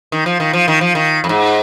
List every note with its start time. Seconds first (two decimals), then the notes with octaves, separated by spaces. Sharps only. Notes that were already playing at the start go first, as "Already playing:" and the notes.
0.12 D#3
0.26 F3
0.40 D#3
0.53 F3
0.68 D#3
0.81 F3
0.95 D#3
1.24 F2
1.29 G#2